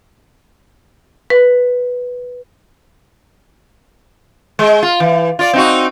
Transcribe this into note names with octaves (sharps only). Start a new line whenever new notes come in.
B4
G#3
F4
E3
F4 D5
C4 D#4 F#4